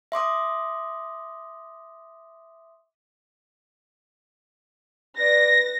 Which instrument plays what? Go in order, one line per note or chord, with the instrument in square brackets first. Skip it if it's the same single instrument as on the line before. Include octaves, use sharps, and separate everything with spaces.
[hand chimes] E5 C6 D6 D#6
[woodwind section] B4 D5 [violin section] A#6